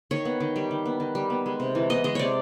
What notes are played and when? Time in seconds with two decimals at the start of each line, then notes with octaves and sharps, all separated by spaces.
0.11 D#3 C#5
0.25 B3
0.40 D#3
0.56 G3
0.71 D#3
0.86 B3
1.00 D#3
1.15 G3
1.30 B3
1.46 G#3
1.60 C3
1.75 E3
1.90 B3 D#5
2.04 G#3 D#5
2.15 C3 C#5 D5